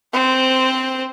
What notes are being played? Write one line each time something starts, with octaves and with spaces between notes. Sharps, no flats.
C4 C5